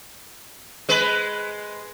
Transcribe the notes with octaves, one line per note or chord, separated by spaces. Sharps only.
G#3 B4